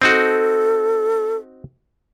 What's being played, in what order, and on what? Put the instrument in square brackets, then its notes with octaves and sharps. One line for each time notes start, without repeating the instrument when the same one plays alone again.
[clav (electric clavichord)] C4 D#4 F#4 [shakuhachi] A4